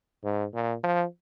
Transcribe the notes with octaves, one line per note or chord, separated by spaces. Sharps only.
G#2
A#2
F3